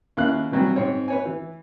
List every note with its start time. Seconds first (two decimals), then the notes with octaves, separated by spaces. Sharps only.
0.17 D#2 C#4 E4 A#4 F5 F#6
0.51 C3 E3 F#3 G3
0.76 G#2 C4 C#5
1.08 B4 C#5 G#5
1.26 E3